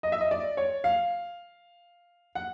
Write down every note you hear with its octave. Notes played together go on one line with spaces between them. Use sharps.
D#5
E5
D#5
D5
C#5
F5
F#5